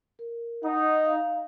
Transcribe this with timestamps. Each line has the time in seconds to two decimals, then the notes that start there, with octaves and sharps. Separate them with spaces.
0.19 A#4
0.63 D#4 F#5
1.05 F5